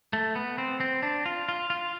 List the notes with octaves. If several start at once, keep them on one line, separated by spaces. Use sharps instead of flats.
A3
B3
C4
C4
D4
F4
F4
F4